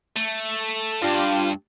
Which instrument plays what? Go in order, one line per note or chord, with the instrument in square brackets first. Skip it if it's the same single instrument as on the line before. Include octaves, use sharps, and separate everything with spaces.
[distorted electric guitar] A3
[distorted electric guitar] G2 [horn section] D4 F4 G4